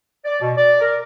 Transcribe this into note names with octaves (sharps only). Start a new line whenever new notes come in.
D5
B2
D5
A#4